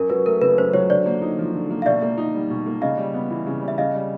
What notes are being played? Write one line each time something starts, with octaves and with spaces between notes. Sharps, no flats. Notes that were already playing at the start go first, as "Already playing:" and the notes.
Already playing: F#2 A#4
F#3 B4
A3 A#4
C#3 B4
F#2 C5
F#3 C#5
D3 C5 D5
A#3
D#4
F3
D3
A#3
F5
B2 D5 E5
A#3
D#4
G3
B2
A#3
C#3 D#5 F5
G3
B3
E3
C#3
G3
E5
C#3 D#5 F5
G3